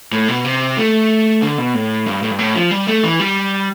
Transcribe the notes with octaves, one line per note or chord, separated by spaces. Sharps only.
A2
B2
C3
A3
D3
B2
A2
G2
A2
G2
A2
F3
G3
A3
E3
G3